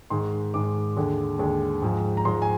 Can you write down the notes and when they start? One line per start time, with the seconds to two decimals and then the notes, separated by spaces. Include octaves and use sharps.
0.10 G#2 D#3 G#3 C6
0.54 G#2 D#3 G#3 D6
0.96 D#2 D3 G#3
1.39 D#2 D3 G#3
1.82 G#2 F3 G#3
2.17 A#5
2.25 G#2 F3 G#3 C6
2.42 G#5